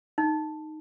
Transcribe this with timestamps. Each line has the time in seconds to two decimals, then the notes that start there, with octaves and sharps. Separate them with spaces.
0.18 D#4